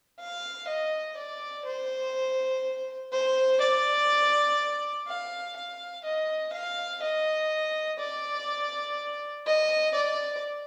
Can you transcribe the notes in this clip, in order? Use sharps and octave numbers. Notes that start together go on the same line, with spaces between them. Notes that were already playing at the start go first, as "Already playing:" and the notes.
F5
D#5
D5
C5
C5
D5
F5
F5
D#5
F5
D#5
D5
D#5
D5